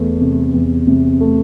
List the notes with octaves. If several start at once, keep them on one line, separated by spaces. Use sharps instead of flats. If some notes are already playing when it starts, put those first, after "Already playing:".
Already playing: E2 A3
C3
E2
C3
A3